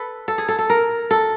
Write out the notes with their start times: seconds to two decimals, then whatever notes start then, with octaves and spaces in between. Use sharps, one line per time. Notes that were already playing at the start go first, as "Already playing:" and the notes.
Already playing: A4 B4
0.28 A4
0.38 G#4
0.49 A4
0.59 A4
0.70 A#4
1.11 A4